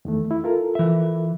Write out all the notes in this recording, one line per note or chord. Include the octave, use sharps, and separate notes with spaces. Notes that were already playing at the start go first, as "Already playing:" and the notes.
E2 D#3 A3
E4
F4 A4 A#4
E3 E5